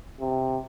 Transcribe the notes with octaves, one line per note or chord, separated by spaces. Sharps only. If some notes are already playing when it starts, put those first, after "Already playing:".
C3